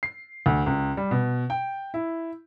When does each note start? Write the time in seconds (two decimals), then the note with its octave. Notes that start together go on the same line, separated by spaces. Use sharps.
0.03 C7
0.46 D2
0.66 C#2
0.97 G3
1.11 B2
1.50 G5
1.94 E4